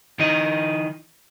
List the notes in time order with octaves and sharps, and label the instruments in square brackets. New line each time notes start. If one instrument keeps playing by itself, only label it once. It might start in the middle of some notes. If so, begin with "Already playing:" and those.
[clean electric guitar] E3 D#4 D#5